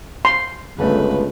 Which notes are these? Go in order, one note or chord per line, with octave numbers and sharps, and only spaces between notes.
C6
G1 C#2 A3 B4